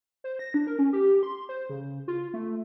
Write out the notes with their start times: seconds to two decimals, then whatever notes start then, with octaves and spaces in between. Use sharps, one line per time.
0.24 C5
0.39 A#6
0.54 D4
0.67 A#4
0.79 C#4
0.93 G4
1.23 C6
1.49 C5
1.70 C#3
2.08 F4
2.34 A3